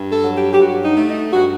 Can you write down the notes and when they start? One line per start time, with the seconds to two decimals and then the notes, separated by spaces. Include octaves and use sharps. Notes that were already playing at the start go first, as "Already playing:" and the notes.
Already playing: G2
0.11 A4
0.23 F#3
0.36 G4
0.53 G4
0.59 G2 F#4
0.84 D#4
0.96 A3
1.08 D#4
1.32 G2 F#4